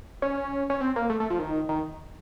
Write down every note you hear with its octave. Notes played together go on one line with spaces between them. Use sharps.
C#4
C#4
C4
A#3
A3
A3
F3
D#3
D#3